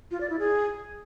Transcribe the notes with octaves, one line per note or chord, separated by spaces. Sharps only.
F4
D5
E4
G#4